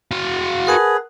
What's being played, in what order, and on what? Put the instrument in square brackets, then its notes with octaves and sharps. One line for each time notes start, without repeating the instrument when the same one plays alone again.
[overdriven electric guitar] F#4 F5
[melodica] G#4 B4 [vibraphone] A#4 F#5 A5